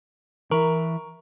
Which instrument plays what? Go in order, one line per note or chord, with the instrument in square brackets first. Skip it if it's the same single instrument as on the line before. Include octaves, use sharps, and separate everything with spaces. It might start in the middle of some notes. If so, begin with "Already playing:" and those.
[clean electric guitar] E3 E4 [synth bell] A#4 A#5 C#6